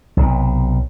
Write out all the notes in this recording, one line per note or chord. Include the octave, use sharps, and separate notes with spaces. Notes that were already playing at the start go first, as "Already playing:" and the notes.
B1 C3